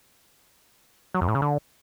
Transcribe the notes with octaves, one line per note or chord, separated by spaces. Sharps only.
F#3
F2
A2
C#3
D3